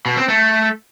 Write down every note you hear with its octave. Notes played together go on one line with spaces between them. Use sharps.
B2
C4
A3